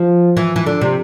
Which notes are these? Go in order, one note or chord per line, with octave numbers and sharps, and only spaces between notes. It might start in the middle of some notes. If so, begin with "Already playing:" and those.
Already playing: F3
E3
E3
D3
C3